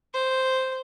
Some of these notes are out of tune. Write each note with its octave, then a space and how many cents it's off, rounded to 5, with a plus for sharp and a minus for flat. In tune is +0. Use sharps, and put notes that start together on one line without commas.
C5 -5